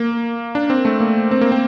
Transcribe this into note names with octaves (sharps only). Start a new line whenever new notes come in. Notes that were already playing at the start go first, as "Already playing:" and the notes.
Already playing: A#3
D4
C4
A3
A#3
C4
A#3
C4